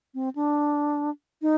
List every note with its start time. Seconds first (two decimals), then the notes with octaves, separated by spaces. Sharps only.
0.14 C4
0.35 D4
1.42 D#4